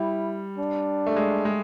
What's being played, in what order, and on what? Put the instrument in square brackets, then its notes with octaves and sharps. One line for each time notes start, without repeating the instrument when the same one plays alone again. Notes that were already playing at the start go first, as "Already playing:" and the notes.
Already playing: [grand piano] G3 [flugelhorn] E4
[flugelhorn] D4
[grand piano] A3
G#3
G#3